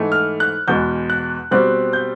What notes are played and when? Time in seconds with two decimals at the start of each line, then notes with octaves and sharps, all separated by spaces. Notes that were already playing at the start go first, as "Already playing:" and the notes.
Already playing: G#2 E3 A3
0.12 F6
0.40 F#6
0.68 E2 B2 G#3 B3 G6
1.10 F#6
1.51 B2 G3 C4 F#6
1.93 G6